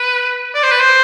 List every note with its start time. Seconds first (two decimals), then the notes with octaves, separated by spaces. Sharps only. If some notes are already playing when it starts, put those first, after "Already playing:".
Already playing: B4
0.54 D5
0.63 C5
0.71 B4
0.80 C5